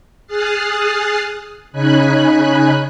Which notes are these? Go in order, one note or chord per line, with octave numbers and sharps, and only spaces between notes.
G#4 D#6 F6 F#6 A6 C7
C#3 C#4 D#4 G#5 B5 F#6